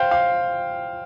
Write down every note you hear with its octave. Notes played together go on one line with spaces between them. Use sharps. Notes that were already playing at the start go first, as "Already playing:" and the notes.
Already playing: C5 F5 G5
F5